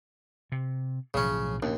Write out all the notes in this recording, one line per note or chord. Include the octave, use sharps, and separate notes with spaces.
C3
B1 A2 C#3 F3 C#4
A#1 D#2 C#4 D4